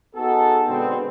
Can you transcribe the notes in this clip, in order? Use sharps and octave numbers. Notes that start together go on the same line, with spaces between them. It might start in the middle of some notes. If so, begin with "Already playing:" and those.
B3 D#4 F#4 G#4 A4
B2 D3 G#3 B3 C4